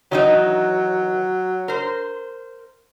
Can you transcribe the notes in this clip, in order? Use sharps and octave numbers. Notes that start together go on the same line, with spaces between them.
D#3 E3 F#3 D#4
A#4 C5